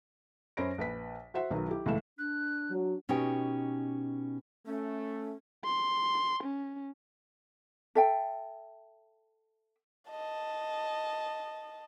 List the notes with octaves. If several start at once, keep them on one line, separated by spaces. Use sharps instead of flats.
F#2 C#4 C5 B5 A#6 D7
A#1 B4 B6
F#4 C5 E5 F#5
B1 D#3 F#3 B4
E4 G4
C#2 A2 E3 A4 E5 E7
D4 F#6
F#3
B2 C#4 D#4 G4 G5
A3 C#4
C6
C#4
A4 E5 G5
D#5 A5